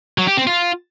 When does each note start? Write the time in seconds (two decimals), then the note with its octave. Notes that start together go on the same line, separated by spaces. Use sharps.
0.18 F#3
0.28 G4
0.37 C4
0.47 F4